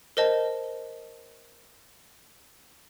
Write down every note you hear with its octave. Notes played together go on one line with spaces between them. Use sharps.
A#4 C5 D#5 A5